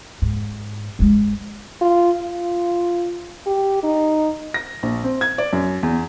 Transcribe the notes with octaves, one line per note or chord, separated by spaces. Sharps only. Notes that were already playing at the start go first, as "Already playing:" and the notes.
G#2
G2 G#3
F4
F4
G4
D#4
A#6
A#1
C4
G#6
D5
F#2
E2